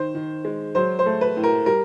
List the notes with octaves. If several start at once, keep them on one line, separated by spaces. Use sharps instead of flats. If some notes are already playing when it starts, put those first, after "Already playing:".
Already playing: D#3 C5
D#3
G#3
F#3 C5
C5
A3
B4
A2
A#4
G3 A#4